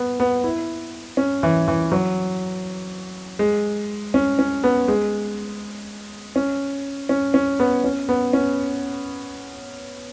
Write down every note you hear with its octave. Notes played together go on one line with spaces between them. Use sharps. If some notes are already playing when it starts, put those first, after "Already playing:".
Already playing: B3
B3
E4
C#4
E3
E3
F#3
G#3
C#4
C#4
B3
G#3
C#4
C#4
C#4
B3
C#4
B3
C#4